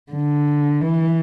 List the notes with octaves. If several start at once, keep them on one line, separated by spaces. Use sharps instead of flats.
D3
E3